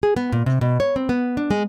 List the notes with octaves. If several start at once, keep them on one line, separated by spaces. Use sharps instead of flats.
G#4
B3
A#2
C3
B2
C#5
C4
B3
D4
G#3